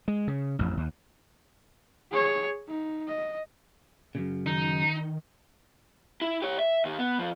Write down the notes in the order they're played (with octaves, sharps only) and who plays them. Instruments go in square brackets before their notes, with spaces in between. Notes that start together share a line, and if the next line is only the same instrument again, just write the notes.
[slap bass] G#3
C#3
A1 F2
D#2
[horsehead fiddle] G#4 C#5
D#4
D#5
[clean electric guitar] F#2 A#2 C#3
[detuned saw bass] D#3 [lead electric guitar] D#4
[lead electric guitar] E4
G4 C#5
E5
D#2 D#3
B3
F2 F3